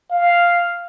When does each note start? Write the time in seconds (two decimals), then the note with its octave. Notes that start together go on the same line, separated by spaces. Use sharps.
0.11 F5